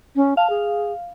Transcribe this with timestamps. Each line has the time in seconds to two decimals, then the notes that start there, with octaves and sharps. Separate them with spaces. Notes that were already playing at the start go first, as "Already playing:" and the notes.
0.16 C#4
0.37 F5 A5
0.50 G#4